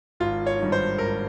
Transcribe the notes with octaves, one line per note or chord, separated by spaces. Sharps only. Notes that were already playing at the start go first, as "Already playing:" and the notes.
G#1 F4
C#5
G2 D#3
C5
G#1 A#4